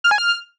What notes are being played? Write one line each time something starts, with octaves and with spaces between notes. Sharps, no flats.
F6
G#5
F6